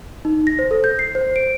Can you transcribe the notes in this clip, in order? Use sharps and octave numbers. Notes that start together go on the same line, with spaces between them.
D#4
A#6
C5
A4
G6
C7
C5
D7